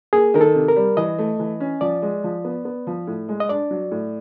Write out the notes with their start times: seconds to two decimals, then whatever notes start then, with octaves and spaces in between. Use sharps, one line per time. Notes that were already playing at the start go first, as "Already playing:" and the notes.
0.13 A#3 G#4
0.34 D#3 A#4
0.41 A4
0.55 C3
0.68 A#4
0.76 G3
0.97 E3 D#5
1.18 A3
1.39 E3
1.60 C#4
1.81 F3 D5
2.02 G#3
2.24 F3
2.44 B3
2.65 B3
2.87 F3
3.07 A2
3.29 G#3
3.40 D#5
3.49 D4 D5
3.71 F#3
3.91 A2